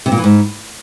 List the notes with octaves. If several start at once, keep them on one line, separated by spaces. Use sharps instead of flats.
C3
A#2
E3
G#2